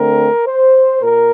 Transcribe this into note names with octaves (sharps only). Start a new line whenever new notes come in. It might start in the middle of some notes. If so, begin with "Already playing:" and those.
Already playing: D3 A3 C4 A#4
C5
A#2 A#4